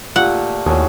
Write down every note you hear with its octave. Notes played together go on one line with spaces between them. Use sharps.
A#2 A3 F4 G4 F#5
D#2 A2 F#4 G#4 A5